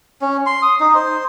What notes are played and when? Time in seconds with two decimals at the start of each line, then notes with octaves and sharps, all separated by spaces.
0.22 C#4
0.46 C6
0.62 D#6
0.80 D#4
0.95 C5